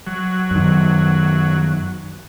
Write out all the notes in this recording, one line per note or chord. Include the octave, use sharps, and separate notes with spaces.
F#3
F#2 D#3